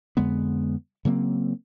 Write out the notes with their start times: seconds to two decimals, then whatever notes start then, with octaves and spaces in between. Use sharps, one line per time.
0.17 F2 D3 G#3 B3
1.05 C#3 F#3 A#3 C4